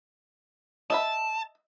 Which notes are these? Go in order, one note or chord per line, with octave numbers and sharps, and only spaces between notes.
D#5 E5 A5 B5